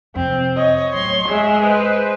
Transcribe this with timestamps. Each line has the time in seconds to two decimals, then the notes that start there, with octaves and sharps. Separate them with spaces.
0.15 F2 C3 C4
0.58 C#5 D#5
0.94 D1 F#3 C6
1.28 E1 G#3 G#4 E5
1.63 B4 C5